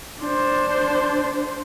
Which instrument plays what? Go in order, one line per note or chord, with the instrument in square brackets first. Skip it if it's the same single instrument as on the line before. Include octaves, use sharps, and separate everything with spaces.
[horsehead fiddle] D4 C5